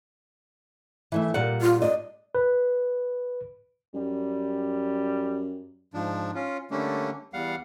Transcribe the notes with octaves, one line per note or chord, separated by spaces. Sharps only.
E3 A3 E5
A#2 G3 F#5
F4
D5 D#5
B4
F#2 G3
G#2 F3 D4
C#4 F4
D3 G3 A3 A#3 C#4 D4
E2 G3 F5 F#5